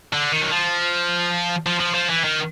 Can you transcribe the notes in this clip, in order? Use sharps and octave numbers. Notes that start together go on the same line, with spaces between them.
D3
D#3
F#3
F3
F3
F3
F3
E3
D#3